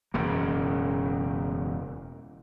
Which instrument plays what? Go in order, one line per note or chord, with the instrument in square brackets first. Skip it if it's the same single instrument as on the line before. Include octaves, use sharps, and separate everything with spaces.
[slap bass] E1 F#2 C#3 A#3